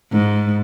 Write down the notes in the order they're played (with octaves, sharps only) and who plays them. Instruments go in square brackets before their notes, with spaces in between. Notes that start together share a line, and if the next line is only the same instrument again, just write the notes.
[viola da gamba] G#2